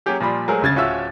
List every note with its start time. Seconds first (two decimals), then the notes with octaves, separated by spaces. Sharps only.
0.06 F#3 A#3 C#4 G4 G#4
0.20 A#2 F3 G3 B5 C6
0.48 F#3 G#3 A3 G#4 A#4 C5
0.61 G1 C#2 C#3 G#6 A6
0.76 D1 C#4 F4 F#4 E5 E6